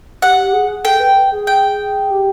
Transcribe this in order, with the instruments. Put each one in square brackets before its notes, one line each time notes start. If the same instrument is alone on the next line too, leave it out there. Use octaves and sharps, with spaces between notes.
[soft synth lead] G4 [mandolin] F#5
[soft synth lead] G#4
[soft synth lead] A4 [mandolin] G5
[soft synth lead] B4
G#4
[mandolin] G5
[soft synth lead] G4